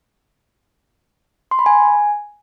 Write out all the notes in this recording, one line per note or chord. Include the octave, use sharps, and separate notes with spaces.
C6
B5
G#5